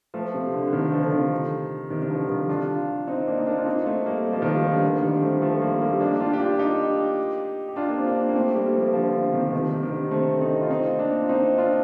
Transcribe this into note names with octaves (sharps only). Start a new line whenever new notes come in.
F3 A3
C3
D3
D3
C3 D#3
D3 F3
D3
C3 D#3
C3 D#3
D#3
D3 F3
D#3 G3
D4 F4
C4 D#4
A#3 D4
D#4
A#3 D4
F4
C4 D#4
A3 C4
G3 A#3
G3
F3
D#3 G3
F3
G3
D3 F3
D3 F3
D#3 G3
A3 C4
F3 A3
G3 A#3
G3 A#3
D#4
A#3 D4
G4
D4 F4
G4
D4 F4
F4
D#4 G4
G4
D4 F4
A#3
C4
A#3 D4
A#3
A3 C4
G3 A#3
F3 A3
D3 F3
D3
C3 D#3
F3
C3 D#3
C3
D#3
D3
A3 C4
C4 D#4
F4
C4 D#4
A#3 D4
F4
C4 D#4
D4 F4